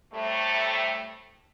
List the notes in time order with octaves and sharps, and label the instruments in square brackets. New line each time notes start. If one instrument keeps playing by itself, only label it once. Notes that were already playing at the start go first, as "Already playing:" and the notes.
[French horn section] A2 C3 G3 A3